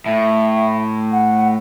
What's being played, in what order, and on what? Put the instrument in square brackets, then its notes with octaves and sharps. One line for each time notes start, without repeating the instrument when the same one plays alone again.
[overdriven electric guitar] A2 [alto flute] E5
[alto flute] F#5